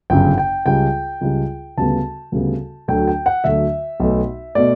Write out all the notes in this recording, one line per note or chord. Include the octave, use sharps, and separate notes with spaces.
G1 F#2 C#3 F#3 G5
G5
C#2 C#3 G3 G5
C#2 C#3 G3
D2 C#3 G3 B3 A5
D2 C#3 G3 B3
D2 D3 F#3 A3 G5
G5
F#5
D2 D3 F#3 A3 E5
B1 B2 A3
B2 A3 D5